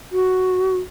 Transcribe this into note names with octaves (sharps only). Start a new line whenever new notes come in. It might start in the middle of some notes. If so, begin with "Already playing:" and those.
F#4